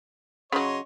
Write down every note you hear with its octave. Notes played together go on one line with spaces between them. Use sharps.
C#3 F#3 C#5 D#5 C6